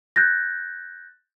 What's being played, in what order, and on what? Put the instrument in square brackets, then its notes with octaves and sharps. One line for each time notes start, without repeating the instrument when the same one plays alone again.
[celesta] F#6 G6 A6 A#6